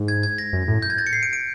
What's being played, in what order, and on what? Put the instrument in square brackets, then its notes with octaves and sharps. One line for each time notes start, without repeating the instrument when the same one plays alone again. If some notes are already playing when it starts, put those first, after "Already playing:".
Already playing: [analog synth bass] G#2
[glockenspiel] G#6
G#6
A#6
[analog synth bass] F#2
A2
[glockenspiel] G6
G#6
A6
C#7
C7
D7
D7